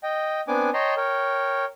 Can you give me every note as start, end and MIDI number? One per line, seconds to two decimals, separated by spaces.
0.03 0.41 75
0.03 0.41 79
0.48 0.70 59
0.48 0.70 60
0.48 0.70 62
0.48 0.70 80
0.48 0.70 86
0.74 0.94 73
0.74 0.94 75
0.74 0.94 79
0.74 0.94 81
0.74 0.94 82
0.74 0.94 84
0.97 1.65 70
0.97 1.65 73
0.97 1.65 79